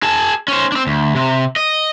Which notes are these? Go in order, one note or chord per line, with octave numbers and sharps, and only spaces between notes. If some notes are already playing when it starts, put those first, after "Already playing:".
G#4 A5
C#4 C5
C4 D4
D2
C3
D#5